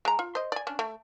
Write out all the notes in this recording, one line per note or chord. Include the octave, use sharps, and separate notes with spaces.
G#3 A#5
F4
C5 D#5
D5 G#5
C#4 D4
A3